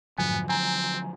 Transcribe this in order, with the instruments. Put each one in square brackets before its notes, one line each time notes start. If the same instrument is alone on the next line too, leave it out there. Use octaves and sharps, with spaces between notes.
[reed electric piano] F2 G#2 G#5 [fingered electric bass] D3 F3 F#3 [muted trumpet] B3
[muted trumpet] C4 [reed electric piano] G#5 A#5